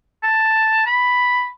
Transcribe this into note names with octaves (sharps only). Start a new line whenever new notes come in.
A5
B5